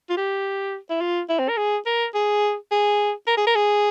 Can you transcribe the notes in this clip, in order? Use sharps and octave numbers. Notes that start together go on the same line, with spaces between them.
F4
G4
E4
F4
E4
C4
A#4
G#4
A#4
G#4
G#4
A#4
G#4
A#4
G#4